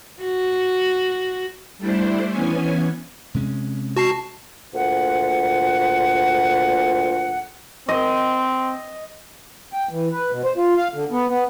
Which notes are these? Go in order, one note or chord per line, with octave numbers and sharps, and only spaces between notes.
F#4
G3 A3 D4 E4 C5
E3 B3 C#4 G#5
C3 G#3 C#4
F#4 A5 C7
D2 A#2 F3 F#5
C4 D#5
G5
E3
B4
B2
C5
F4
F5
D3
B3
B3